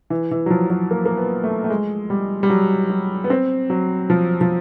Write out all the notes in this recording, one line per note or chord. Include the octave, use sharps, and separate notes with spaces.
E3
E3
F#3
F3
F#3
A#3
A#3
B3
A3
A3
G#3
G3
G3
F#3
F#3
B3
C4
F#3
F3
F3